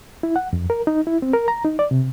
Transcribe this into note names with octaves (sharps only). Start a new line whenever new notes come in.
E4
F#5
F2
A#4
D#4
E4
C4
A#4
A#5
D#4
D5
C3